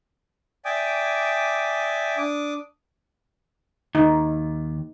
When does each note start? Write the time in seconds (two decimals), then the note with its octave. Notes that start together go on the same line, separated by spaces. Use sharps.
0.65 D5 E5 G5 G#5 D6 D#6
2.17 D4 D6 D#6
3.95 D#2 D#4